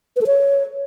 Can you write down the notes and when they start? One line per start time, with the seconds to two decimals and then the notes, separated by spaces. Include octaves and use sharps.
0.16 B4
0.21 A4
0.27 C#5